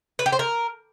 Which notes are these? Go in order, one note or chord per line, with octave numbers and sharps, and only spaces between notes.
B4
G4
C5
A#4